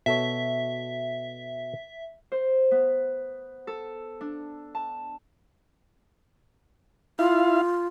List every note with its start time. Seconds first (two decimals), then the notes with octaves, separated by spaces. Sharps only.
0.06 B2 A4 C#5 E5
2.32 C5
2.71 B3
3.67 A4
4.21 D4
4.75 A5
7.19 E4 F4 F5